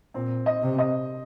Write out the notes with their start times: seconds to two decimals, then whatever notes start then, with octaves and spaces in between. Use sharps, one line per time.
0.14 A#2 C4
0.46 D#5
0.63 C3
0.78 D#5